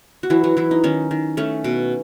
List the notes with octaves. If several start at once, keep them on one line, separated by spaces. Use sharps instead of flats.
F#4
E3 F#3 E4
F#3 F#4
E3 F#3 E4
D#4
D#3 C#4
D#3
A3 C#4
B2